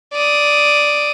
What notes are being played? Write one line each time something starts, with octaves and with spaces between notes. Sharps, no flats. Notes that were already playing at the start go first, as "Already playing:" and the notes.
D5 D#6